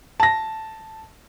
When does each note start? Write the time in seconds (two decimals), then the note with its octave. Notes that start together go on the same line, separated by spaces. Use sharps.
0.20 A5 A#6